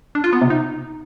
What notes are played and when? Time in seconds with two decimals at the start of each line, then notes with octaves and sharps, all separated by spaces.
0.15 D4
0.24 F4
0.33 B3
0.41 C3
0.50 D#4